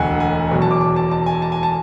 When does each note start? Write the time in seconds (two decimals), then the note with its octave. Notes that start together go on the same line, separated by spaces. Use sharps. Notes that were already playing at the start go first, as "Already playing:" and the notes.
Already playing: E1 D2 D3 F#3 F#5 G#5
0.20 G#5
0.51 E2 B2 F#3 G#5
0.62 A5
0.71 D6
0.81 D6
0.96 A5
1.11 A5
1.26 G#5
1.42 A5
1.52 G#5
1.63 A5